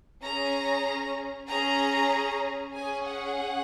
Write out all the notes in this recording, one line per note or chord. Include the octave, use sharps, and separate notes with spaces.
C#4 G#4 A#5
C#4 G#4 A#5
C#4 G#4 G#5
F#5